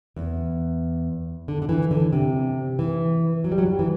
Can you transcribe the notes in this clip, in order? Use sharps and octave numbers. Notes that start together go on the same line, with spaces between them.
E2
D3
D3
E3
D3
C3
E3
F#3
G3
F#3
G3
E3